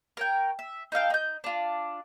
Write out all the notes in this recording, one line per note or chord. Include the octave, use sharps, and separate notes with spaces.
A#4 C#5 G5
E5
D#4 A4 F5 G5
D#4 G6
D4 F4